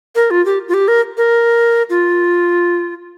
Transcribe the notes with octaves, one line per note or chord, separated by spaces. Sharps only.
A#4
F4
G4
F4
G4
A#4
A#4
F4